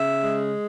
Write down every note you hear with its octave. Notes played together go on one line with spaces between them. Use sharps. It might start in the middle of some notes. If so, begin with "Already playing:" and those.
Already playing: C#3 E5
G#3